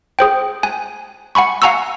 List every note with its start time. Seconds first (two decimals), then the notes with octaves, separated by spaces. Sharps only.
0.19 G#4 C5 G5
0.63 G#5
1.35 F#5 G#5 B5 C#6
1.62 F5 F#5 G#5 A#5 C#6 E6